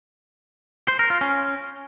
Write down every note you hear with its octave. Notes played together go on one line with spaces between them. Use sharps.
C5
A#4
F4
C#4